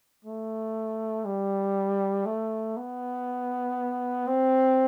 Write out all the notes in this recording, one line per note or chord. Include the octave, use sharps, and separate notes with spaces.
A3
G3
A3
B3
C4